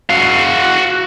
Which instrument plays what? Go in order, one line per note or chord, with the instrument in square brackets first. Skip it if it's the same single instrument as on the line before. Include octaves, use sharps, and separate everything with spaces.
[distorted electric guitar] F#4 F5